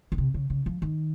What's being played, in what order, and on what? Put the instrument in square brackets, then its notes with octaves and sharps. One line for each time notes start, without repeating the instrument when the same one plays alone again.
[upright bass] C#3
C3
C#3
C#3
F3
D#3